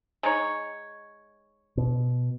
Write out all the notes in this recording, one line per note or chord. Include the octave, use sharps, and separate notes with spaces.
G#3 D#4 C#5
B2